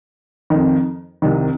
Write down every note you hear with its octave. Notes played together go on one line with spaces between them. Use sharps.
F2 D#3
C2 C3 D#3